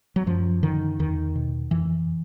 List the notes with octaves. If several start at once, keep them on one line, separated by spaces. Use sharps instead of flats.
F#3
F#2 F3
D3 D#3
E2 D#3
B2
F2 E3